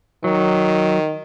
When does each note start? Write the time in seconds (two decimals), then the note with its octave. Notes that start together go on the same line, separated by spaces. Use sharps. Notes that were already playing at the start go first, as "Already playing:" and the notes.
0.24 D#3 F#3